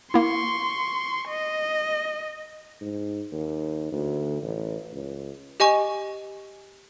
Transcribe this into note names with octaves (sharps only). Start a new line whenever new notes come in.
A#3 E4 C6 C#6
D#5
G#2
D#2
D2
A1
C#2
G4 D#5 G#5 C#6